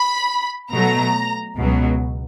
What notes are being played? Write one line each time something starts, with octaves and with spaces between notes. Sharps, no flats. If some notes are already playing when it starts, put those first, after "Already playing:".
Already playing: B5
B2 F#3 A3 A#5
C#2 B2 F#3